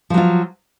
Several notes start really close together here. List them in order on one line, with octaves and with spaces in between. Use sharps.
F3 F#3 F4